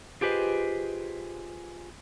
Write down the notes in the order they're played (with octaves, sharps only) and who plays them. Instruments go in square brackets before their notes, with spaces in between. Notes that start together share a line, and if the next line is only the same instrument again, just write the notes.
[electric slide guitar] F4 G4 G#4 B4 C5 D#5